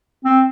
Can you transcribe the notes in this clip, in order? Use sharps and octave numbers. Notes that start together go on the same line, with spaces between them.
C4